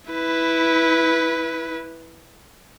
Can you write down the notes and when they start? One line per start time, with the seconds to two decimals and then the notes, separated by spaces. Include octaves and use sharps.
0.11 E4 B4